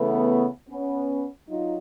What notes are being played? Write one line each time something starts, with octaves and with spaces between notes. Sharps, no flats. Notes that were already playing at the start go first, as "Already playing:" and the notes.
Already playing: C#3 E3 A3 B3
B3 C#4
F#3 D#4 F4